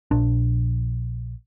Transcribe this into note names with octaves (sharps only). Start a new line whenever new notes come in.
A#1 D4